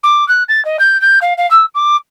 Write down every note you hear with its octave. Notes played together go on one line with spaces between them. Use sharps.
D6
F#6
A6
D#5
G6
G6
F5
F5
E6
D6